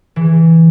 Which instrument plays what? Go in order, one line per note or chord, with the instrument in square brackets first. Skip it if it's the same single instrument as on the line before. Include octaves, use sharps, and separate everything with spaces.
[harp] E3